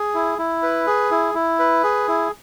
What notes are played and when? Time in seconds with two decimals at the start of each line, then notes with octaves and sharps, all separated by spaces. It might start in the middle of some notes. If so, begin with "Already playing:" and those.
Already playing: G#4
0.14 E4
0.38 E4
0.63 B4
0.87 G#4
1.11 E4
1.35 E4
1.59 B4
1.84 G#4
2.08 E4